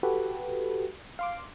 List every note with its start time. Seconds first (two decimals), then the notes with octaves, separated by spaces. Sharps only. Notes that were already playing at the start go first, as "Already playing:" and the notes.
0.03 F#4 G4 A4 B4
1.19 F5 C6 D6